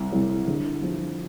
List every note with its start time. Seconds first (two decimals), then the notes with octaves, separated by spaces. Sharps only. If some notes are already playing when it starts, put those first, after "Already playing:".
Already playing: C2
0.13 C2
0.48 D3
0.82 F3